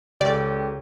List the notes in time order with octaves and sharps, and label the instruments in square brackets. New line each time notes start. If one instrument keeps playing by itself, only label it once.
[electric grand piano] C#2 A4 [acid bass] C#3 [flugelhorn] G4 [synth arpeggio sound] D5